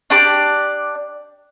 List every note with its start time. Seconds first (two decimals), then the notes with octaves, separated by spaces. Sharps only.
0.10 D4 G4 D5 D6